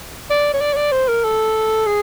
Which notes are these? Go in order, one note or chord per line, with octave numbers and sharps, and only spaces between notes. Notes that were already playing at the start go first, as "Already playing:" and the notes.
D5
C#5
D5
C#5
D5
C5
A#4
A4
G#4